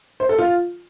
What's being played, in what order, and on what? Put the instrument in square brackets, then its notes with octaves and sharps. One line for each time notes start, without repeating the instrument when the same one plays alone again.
[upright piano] C5
A4
F4